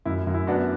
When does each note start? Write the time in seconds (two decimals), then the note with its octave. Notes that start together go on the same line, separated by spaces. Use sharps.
0.05 F#2 E4
0.27 F#2
0.34 E4
0.47 B3 D4 F#4